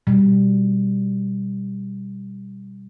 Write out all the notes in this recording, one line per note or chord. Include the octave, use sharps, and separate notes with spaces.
B2 G3